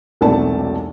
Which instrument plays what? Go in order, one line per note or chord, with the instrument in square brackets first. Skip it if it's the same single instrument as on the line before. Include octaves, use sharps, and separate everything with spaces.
[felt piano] E1 B1 C3 A3 D5 A5